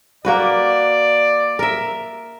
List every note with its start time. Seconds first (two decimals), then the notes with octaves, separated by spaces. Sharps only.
0.25 A#3 F#4 B4 D5
1.59 A#4 E5